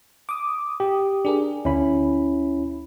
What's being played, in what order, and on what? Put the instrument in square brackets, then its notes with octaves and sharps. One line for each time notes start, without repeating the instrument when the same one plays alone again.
[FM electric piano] D6 D#6
[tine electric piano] G4
[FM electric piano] D4 G#4 A#4
[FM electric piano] D2 [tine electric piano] C#4 E4 B5